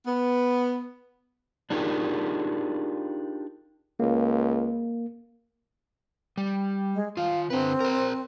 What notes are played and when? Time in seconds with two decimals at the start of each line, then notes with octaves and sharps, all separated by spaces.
0.06 B3
1.70 D4 D#4 F4 G4 G#4 A#4
4.00 C#2 A#3
6.37 G3
6.94 G#3
7.17 D#3 F4 F5
7.50 D3 C4 B4
7.80 A#4 C5